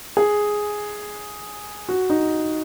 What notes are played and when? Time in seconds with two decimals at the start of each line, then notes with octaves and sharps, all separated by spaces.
0.17 G#4
1.89 F#4
2.10 D#4